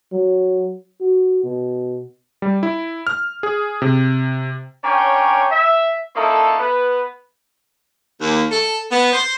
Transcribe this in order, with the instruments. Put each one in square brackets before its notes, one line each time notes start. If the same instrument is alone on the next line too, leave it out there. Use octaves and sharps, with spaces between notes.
[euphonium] F#3
F#4
B2
[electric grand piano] G3
E4
F6
G#4
C3
[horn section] C#4 D4 A#4 C#5 G5 G#5
E5
A#3 C#4 D#4 E4 A4
B3 B4
[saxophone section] D#2
A4
B3
C5